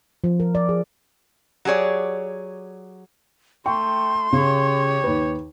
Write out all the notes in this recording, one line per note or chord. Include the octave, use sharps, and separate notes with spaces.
F3
A#4
D5
G#4
F#3 G4 G#4 C#5 D5
A3 G5 C6 C#6
C#3 G4 C#5
D#2 B4